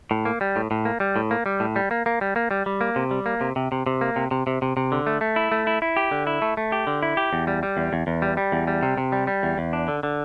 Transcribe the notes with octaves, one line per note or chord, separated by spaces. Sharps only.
A2
A#3
G3
A2
A2
A#3
G3
A2
A#3
G3
A2
G3
A#3
A#3
G3
A#3
G3
G3
A#3
C3
G3
A#3
C3
C3
C3
C3
A#3
C3
C3
C3
C3
C3
D3
A3
A3
E4
A3
E4
E4
G4
D3
E4
A3
A3
G4
D3
E4
G4
E2
G3
G3
E2
E2
E2
G3
G3
E2
G3
C3
C3
G3
G3
E2
E2
D4
D3
D3